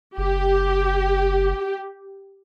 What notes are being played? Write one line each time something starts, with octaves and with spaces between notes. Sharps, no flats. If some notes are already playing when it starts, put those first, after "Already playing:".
F#1 G4